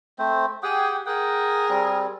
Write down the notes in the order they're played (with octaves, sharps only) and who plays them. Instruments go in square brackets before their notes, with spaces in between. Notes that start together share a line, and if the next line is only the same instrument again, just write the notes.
[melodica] A3 C4 C5
[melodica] G4 F#5 G5 [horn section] G#4
[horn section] G#4 A#4 [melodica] F#5 G5
[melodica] G3 C4